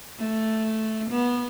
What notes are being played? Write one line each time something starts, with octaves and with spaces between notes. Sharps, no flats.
A3
B3